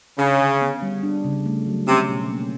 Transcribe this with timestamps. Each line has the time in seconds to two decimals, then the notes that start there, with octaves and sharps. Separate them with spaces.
0.18 C#3 D4
0.40 D3
0.61 B3
0.82 G3
1.03 D4
1.25 C#3
1.46 A3
1.67 F#3
1.88 C3 C#4
2.09 B2
2.30 A#3